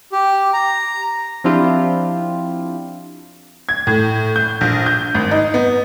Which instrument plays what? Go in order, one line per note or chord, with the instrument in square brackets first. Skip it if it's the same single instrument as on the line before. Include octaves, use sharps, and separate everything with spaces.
[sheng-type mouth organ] G4
A#5
[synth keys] F3 C4 D4 E4 F4 G4
[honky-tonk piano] G#6
A2
G6
A#1
G6
G#1
D#4
B3